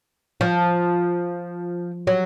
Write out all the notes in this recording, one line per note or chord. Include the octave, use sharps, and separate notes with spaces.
F3
F#3